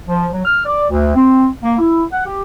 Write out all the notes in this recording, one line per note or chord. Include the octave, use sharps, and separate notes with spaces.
F3
F#3
F6
D5
D2
C4
A#3
E4
F#5
G4